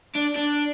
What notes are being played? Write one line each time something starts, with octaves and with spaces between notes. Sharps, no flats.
D4
D4